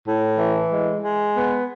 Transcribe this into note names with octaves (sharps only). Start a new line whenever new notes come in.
A2
E3
G#3
G#3
B3